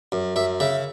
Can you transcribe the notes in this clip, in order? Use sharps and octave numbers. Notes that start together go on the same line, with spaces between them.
F#2
F#2 E5
C#3 E5